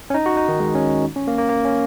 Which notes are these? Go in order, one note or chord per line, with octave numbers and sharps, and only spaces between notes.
C#4
D#4
F#4
D#4
D#3
G#3
C#4
C#4
A#3
A#3
A#3
C#4